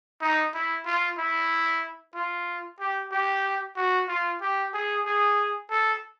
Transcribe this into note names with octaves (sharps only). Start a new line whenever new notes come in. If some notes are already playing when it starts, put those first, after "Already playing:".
D#4
E4
F4
E4
F4
G4
G4
F#4
F4
G4
G#4
G#4
A4